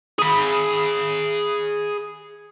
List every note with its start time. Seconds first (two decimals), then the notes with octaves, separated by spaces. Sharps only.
0.18 G#4 B5